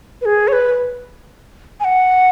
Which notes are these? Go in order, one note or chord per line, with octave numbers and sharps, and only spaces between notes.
B4
G#4
C#5
B4
G#5
F#5